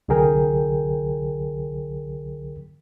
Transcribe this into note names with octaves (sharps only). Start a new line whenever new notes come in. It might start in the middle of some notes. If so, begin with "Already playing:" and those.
C2 D3 F#3 G#4 A#4 G5